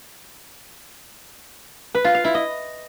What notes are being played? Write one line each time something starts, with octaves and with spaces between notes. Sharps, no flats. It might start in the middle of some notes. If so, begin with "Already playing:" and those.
B4
F4
F5
E4
D#5